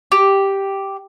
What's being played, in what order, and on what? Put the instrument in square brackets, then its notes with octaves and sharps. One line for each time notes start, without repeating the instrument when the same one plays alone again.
[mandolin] G4